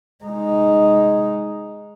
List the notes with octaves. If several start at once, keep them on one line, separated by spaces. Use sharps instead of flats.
G#3 D#4